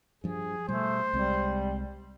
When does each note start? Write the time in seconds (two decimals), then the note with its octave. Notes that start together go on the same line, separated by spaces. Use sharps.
0.24 G2 F3 G#4
0.69 B2 G3 A3 C5
1.13 C2 G3 G#3 C4